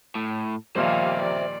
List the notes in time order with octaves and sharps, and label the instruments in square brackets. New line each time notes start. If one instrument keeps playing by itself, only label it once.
[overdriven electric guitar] A2
[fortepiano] D#2 A#2 [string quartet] F3 G3 F5 [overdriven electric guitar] C5 E5
[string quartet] D5